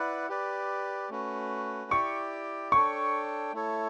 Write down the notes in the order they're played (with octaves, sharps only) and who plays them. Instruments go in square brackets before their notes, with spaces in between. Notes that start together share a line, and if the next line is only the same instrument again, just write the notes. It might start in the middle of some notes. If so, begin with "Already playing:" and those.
Already playing: [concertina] E4 B4 D5 F#5
G4 B4 D5
A3 C#4 F#4 B4
[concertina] E4 G4 D5 G5 [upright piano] C#6
[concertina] D4 A4 C#5 G5 [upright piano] C#6
[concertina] A3 E4 A4 C#5